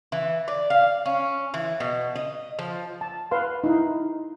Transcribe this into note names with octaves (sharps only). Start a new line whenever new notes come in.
E3
D5
F5
C#4
E3
B2
D#5
F3
A5
B4 F5 C6
D#4 E4